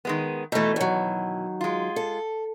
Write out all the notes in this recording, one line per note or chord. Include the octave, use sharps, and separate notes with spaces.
D#3 G#3 B3
B2 E3 A3 D#4
D#3 F#3
G#3 F4
A4